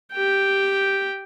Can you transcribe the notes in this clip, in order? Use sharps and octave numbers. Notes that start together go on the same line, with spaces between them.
G4 G5